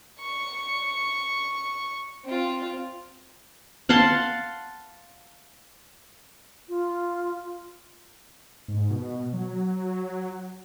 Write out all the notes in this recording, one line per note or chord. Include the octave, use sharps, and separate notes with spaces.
C#6
C4 F4
F5 F#5 A5 C6
F4
G#2
B2
F#3